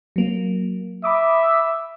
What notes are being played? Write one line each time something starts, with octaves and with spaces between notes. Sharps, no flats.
F#3 A#3
E5 B5 D6 D#6